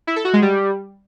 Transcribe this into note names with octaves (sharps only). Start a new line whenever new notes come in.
E4
A4
F#4
G#3
G3